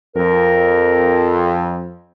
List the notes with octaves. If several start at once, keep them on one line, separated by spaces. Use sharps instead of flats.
F2 A#4